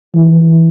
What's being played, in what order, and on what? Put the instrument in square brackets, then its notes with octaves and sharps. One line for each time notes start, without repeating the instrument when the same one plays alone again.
[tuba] E3